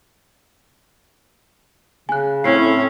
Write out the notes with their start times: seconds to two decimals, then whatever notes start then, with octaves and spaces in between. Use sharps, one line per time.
2.09 C#3 G#5 F#6
2.44 A2 C4 C#4 C7